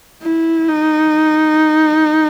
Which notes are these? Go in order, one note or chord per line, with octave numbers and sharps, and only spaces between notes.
E4
D#4